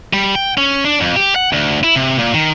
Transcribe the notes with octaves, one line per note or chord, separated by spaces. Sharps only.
G3
G5
C#4
D4
F2
G4
F#5
D2
E4
C3
A#2
D#3